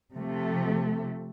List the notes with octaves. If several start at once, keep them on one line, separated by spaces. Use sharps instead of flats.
C3 F3 A3